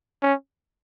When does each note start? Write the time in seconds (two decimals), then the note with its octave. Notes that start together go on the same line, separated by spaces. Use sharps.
0.23 C#4